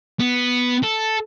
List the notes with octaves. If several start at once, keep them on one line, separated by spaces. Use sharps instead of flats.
B3
A4